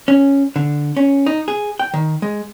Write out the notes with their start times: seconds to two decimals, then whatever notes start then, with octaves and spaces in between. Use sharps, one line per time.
0.08 C#4
0.56 D3
0.97 C#4
1.26 D#4
1.48 G#4
1.79 G5
1.94 D#3
2.22 G#3